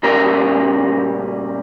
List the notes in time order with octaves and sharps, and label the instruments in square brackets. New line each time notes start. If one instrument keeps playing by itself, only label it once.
[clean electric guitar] A#2 C#3 G3 C#4 A#4